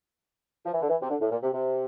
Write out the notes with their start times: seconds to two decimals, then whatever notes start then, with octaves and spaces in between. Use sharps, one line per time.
0.66 F3
0.74 E3
0.82 D3
0.89 E3
1.01 C3
1.10 D3
1.21 A2
1.32 A#2
1.43 C3
1.53 C3